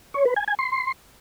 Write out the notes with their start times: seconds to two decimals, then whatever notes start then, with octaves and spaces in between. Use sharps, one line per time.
0.14 C#5
0.25 B4
0.36 G#5
0.48 G#5
0.59 C6